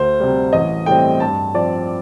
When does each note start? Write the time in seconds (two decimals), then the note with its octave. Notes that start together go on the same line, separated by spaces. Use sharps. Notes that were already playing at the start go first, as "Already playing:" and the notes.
Already playing: D2 C5
0.20 C3 G3
0.53 A1 D#5
0.86 A2 G3 C4 G5
1.20 G2 A5
1.54 F3 C4 D5